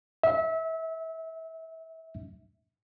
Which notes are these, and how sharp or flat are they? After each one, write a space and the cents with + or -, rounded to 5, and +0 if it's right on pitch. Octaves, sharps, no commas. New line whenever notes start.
E5 -30